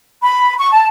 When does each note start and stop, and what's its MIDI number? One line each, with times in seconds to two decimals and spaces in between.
0.23 0.53 83
0.58 0.71 85
0.72 0.86 81